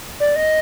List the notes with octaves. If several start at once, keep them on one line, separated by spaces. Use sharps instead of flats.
D5
D#5